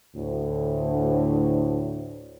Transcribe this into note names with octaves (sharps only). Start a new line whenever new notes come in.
D2 A2